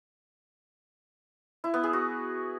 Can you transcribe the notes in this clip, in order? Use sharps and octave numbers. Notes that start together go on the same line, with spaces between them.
E4
B3
G#4
F#4